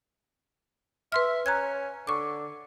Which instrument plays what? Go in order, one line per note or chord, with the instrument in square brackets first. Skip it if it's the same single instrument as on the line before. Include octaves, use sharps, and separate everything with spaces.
[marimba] B4 C6 F6 [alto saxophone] E5
[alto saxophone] C#4 [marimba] A#5 F#6 G#6
[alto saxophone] D3 [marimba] C#6 D6